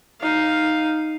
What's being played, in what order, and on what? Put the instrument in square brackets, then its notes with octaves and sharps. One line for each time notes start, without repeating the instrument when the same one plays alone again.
[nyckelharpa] D#4 F5